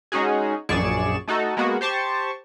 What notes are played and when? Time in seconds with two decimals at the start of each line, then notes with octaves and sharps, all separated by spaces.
0.12 G#3 C#4 D#4 F#4 G#4
0.69 A#1 F#2 G#4 D5 C#6 E7
1.28 A3 D#4 F#4 A4
1.57 G#3 A#3 B3 F#4
1.81 G4 C5 A5 C#6